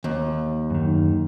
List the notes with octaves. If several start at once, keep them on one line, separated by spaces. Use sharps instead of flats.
D#2
F#2 D#3